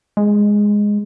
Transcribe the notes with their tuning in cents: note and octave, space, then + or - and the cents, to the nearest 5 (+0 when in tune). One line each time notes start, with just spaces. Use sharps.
G#3 -5